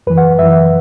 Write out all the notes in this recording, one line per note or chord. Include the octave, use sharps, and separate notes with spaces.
F#2 E3 B4
F#5
F#2 E3 E5